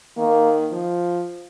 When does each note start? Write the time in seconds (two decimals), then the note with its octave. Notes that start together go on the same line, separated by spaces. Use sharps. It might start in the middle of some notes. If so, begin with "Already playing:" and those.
0.17 D#3 A#3
0.72 F3